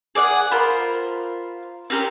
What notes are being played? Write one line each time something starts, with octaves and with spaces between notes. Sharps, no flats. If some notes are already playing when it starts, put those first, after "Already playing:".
G#4 D5 F5 F#5
F4 A#4 C5 B5
C4 C#4 G4 A#4